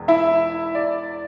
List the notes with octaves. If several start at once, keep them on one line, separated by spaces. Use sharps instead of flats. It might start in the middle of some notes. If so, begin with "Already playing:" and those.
Already playing: E1 E2
E4 E5
D5